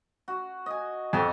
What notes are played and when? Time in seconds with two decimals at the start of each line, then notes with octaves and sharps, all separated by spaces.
0.28 F#4
0.66 D#5 G#5
1.13 F2 F#4 A4 D#5